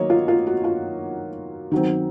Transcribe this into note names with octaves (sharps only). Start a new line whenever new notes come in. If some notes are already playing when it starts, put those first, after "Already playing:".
Already playing: D#3 F#3 A#3 C#5 D#5
F4
F4
F#4
F4
D#3 F#3 C4